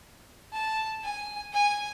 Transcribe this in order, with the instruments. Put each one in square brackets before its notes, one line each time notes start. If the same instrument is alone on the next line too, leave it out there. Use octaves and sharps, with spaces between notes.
[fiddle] A5
G#5
G#5